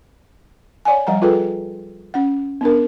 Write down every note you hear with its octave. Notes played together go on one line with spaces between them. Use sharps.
C#5 D5 F#5 G#5
F3 G3 F#5 A#5
F4 G#4 A4 B4 G5
C#4 F#5
B3 D4 A#4